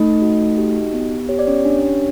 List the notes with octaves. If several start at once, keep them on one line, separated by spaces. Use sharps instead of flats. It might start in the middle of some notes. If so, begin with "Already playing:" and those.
Already playing: A3 D#4 D#5
F#4
G4
B3
G4 C#5
D5
C#4 C#5
D4